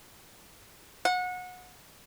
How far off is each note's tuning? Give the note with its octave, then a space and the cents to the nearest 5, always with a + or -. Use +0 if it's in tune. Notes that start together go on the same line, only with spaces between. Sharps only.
F#5 -25